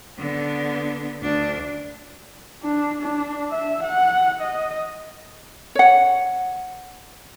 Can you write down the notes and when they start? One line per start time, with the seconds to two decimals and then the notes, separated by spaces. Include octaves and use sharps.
0.19 D3 B3
1.22 D2 D4
2.63 D4
3.01 D4
3.51 E5
3.83 F#5
4.41 D#5
5.75 C#5 F#5